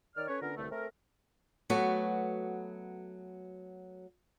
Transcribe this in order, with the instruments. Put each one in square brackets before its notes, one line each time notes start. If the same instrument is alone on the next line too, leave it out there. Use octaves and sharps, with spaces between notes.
[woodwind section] D#3 C#5 D5 F6
C#4 A4 B4 C#5
D3 B3 C#4 F4 A#4
C2 G2 D3 A3
A3 C4 A4 A#4
[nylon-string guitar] F#3 A3 B3 F#4